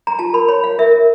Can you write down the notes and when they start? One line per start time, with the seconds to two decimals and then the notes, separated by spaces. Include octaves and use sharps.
0.07 A#5
0.19 F4 A5
0.33 A#4 B5
0.48 C#5 B5
0.63 C#5 F5
0.79 A#4 E5
0.93 A#4